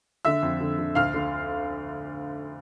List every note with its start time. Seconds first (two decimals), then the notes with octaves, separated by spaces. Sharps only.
0.25 D3 E5 E6
0.43 F2
0.61 D3
0.79 D3
0.95 D2 F5 F6
1.14 D3